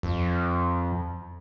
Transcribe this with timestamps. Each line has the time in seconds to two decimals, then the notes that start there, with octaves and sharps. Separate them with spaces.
0.03 F2